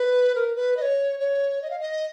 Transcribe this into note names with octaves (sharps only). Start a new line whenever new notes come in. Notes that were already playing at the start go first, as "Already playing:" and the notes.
Already playing: B4
A#4
B4
D#5
C#5
C#5
D#5
F5
D#5